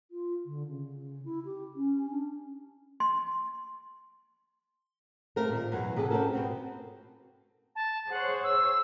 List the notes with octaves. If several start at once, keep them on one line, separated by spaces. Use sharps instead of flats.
F4
D3
C#3
E4
G4
C#4
D4
C6
A3 A#3 C4 A#4
A#2 D#3
E2 B2 F#3
C3 G#4 A4
C4 C#4 F4 F#4 A4 A#4
B2 C4 F#4
A5
G#4 C5 C#5 F#5
E6